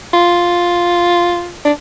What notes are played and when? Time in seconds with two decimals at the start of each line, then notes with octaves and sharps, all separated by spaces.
0.14 F4
1.65 D4